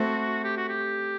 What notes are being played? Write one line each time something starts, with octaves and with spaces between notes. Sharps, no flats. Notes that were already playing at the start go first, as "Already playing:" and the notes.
Already playing: A3 C4 F#4
G4
F#4
G4